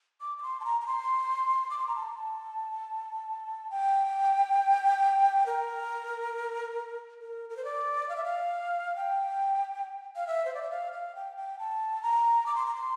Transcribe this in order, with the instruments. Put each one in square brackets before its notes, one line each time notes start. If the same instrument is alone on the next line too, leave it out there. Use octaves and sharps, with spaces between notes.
[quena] D6
D6
C6
A5
A#5
A#5
C6
D6
C6
A#5
A5
G5
A#4
A#4
A#4
C5
D5
F5
E5
F5
G5
F5
E5
C5
D5
E5
F5
F5
G5
G5
A5
A#5
D6
C6
A#5
C6